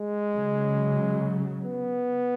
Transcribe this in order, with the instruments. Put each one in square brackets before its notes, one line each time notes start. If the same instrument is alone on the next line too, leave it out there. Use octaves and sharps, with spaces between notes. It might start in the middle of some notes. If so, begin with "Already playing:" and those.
Already playing: [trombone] G#3
[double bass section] C#3 F#3
[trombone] B3